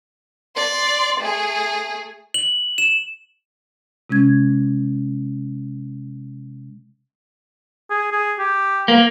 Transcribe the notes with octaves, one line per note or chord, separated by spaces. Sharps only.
D5 C6
A3 G#4
F#7
E7
C3 G#3 C#4 G#6
G#4
G#4
G4
A#3